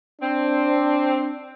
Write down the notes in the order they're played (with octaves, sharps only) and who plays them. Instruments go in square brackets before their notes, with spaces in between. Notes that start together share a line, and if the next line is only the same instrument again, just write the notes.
[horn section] C4 [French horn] D4